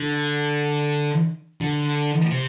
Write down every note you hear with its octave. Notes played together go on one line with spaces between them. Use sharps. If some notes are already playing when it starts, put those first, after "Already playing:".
Already playing: D3
D3
C3